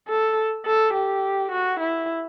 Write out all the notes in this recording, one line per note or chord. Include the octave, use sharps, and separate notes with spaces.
A4
A4
G4
F#4
E4